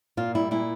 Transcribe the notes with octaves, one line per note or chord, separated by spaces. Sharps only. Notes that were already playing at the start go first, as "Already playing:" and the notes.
A#2 F4
G3 E4
A#2 E4